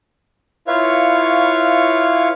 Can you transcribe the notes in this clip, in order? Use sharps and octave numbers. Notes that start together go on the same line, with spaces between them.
E4 F4 B4 C#5 F5 C#6